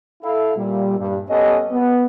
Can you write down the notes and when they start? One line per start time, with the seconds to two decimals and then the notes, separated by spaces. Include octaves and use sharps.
0.23 E4 A4 F5
0.57 A#2 G3
0.98 G2
1.29 B3 C#4 G4 A4 D#5
1.71 B3